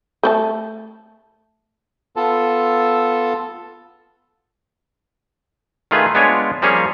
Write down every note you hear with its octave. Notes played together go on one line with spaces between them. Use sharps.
A3 C5 A5
B3 F4 A4 A5
D#3 A3 F4 G#4 B4
G#3 B3 D4 F4 C#5 G#5
F3 G3 A#3 C#4 G#4 C#5